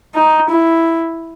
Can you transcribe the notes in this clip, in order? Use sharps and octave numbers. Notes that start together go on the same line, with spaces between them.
D#4
E4